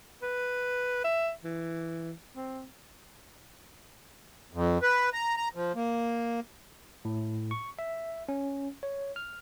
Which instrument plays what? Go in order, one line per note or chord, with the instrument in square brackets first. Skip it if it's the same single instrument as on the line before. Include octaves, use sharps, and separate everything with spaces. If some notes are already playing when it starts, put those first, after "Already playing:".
[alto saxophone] B4
E5
E3
C4
[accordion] F2
B4
A#5
A#5
F3
A#3
[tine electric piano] A2
C#6
E5
C#4
C#5
F6